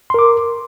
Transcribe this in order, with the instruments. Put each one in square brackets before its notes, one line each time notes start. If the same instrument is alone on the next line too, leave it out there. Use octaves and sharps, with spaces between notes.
[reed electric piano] C6
A#4
D6